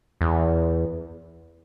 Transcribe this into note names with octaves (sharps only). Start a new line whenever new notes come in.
E2